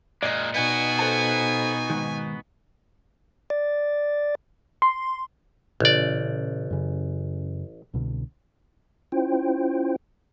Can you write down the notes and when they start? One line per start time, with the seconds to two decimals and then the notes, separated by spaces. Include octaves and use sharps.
0.23 A#2 G#3 D5 D#5
0.54 B2 B3 D#4 F#4 G#5
0.99 A4 C5 A5
1.90 G#2 D#3
3.50 D5
4.82 C6
5.80 A1 A#2 C#3 D5
6.71 F#2 C#3
7.94 C2 B2 D3
9.12 C#4 E4 F4 C5 G5